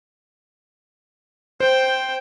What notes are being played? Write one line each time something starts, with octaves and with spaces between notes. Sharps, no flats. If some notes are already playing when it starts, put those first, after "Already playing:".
C5 G5